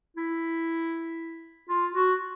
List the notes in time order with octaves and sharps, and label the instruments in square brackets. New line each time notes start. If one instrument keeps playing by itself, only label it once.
[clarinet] E4
F4
F#4